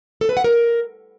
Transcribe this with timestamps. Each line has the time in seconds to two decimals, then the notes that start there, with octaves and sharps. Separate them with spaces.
0.21 A4
0.29 B4
0.37 F#5
0.44 A#4